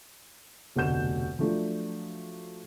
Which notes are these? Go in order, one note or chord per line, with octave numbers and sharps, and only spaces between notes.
F1 D2 B2 F#5 G6 E7
F3 F#3 A3 D4 F4